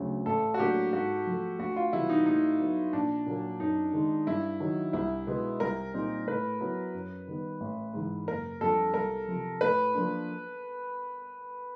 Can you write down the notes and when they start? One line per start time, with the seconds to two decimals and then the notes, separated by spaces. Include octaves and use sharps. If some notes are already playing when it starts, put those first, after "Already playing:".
Already playing: D2 C#3 F#3
0.26 A1 A4
0.54 F#4
0.59 A2 F#3 A#3 D4 G4
0.93 G#2 F#4
1.26 F3 A3
1.59 D2 F#4
1.76 F4
1.93 C3 E3 G3 B3 E4
2.09 D#4
2.26 A2 D#4
2.60 F#3 B3
2.93 A#1 D4
3.26 A#2 F#3 A#3
3.60 F#2 D#4
3.93 D#3 G#3
4.27 G2 E4
4.60 D#3 F#3
4.93 C2 E4
5.27 B2 G#3 B3
5.60 C2 A#4
5.94 A#2 G3 C4 D#4
6.27 A2 B4
6.60 F#3 B3 E4
6.94 F#2
7.28 D#3 G3 B3
7.60 A1
7.94 G#2 E3
8.27 F#1 A#4
8.61 F2 D3 G3 A4
8.94 C2 A#4
9.28 C3 F3
9.61 A2 B4
9.94 F3 A#3 D4